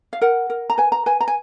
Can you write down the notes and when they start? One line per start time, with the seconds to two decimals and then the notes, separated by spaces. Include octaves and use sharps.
0.13 F5
0.21 A#4 F#5
0.50 A#4
0.70 A#5
0.78 B4 G#5
0.92 A#5
1.06 B4 G#5
1.21 A#5
1.28 G#5